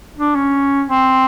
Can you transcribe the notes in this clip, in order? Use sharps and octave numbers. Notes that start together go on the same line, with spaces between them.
D4
C#4
C4